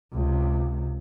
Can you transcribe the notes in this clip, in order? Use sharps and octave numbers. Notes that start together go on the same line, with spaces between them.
C#2 C3